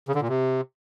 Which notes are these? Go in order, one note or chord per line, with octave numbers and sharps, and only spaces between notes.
C#3
D3
A#2
C3